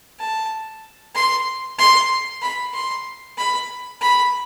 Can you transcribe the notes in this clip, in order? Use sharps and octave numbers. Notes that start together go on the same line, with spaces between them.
A5
C6
C6
B5
C6
B5
B5